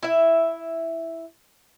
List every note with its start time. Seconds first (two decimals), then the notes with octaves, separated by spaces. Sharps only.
0.03 E4 E5